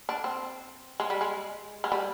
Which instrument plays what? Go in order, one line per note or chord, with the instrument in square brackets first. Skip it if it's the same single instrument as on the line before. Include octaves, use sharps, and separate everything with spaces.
[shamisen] D4
C4
G#3
G3
G#3
G#3
G3